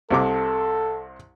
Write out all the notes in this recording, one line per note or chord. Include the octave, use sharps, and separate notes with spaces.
C2 C3 A4 D6